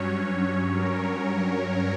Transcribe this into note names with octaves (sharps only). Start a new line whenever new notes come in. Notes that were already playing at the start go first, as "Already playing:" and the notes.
Already playing: G2 F#3 C#4 C#5
A#4